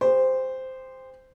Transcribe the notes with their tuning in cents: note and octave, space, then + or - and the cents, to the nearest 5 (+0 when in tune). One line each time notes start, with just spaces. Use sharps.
G4 +35 C5 -10